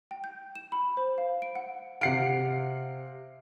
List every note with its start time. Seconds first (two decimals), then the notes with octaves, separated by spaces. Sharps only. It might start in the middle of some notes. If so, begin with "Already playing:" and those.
0.11 G5
0.24 G6
0.55 E7
0.72 B5
0.97 C5
1.18 F5
1.42 D7
1.55 F#5
2.01 C3 F5 F#5 C7 D7